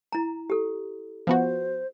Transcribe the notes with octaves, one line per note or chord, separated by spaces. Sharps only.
E4 A#5
G4 A4
F3 B3 F#4 C5